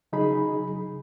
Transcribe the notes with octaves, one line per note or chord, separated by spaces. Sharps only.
C#3 F#3 D#4 G#4 B5